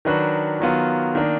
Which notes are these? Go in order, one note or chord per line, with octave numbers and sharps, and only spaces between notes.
D#3 F#3 D4 F#4 B4
D#3 F#3 B3 F4
D#3 A#3 D4